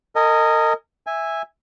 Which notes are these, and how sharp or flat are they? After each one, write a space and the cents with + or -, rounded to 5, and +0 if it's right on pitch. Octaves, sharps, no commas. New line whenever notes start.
A#4 -35 D#5 +0 G#5 +0
E5 +0 G#5 -15